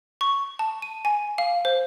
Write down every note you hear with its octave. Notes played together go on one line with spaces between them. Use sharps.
C#6
A5
D#7
G#5
F5
C5